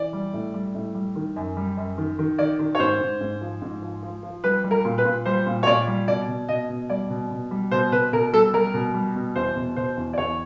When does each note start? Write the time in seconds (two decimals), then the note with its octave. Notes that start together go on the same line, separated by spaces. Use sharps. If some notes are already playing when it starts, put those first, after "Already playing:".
Already playing: E3 D5
0.13 G3
0.33 A2
0.54 G3
0.75 A2
0.95 G3
1.16 D#3
1.36 F#2
1.57 G3
1.77 F#2
1.98 D#3
2.19 D#3
2.38 D#3 D5
2.59 D#3
2.75 C#5
2.80 G#2 C5
3.00 G#2
3.21 G#2
3.41 F3
3.62 G#2
3.82 F3
4.03 F3
4.23 F3
4.44 G3 B4
4.64 G3
4.71 A#4
4.85 A#2
4.98 B4
5.05 A#2
5.25 G3 C5
5.46 A#2
5.63 C#5
5.67 A#2 D5
5.87 G3
6.08 B2 D5
6.28 B2
6.49 B2 D#5
6.69 B2
6.89 G3 D5
7.10 B2
7.31 B2
7.51 G3
7.71 B2 C5
7.92 B2 B4
8.12 B2 A#4
8.33 G3 A4
8.53 G3 A#4
8.74 B2
8.94 G3
9.15 B2
9.36 E2 C5
9.56 B2
9.76 B2 C5
9.97 E2
10.13 D5
10.18 E2 C#5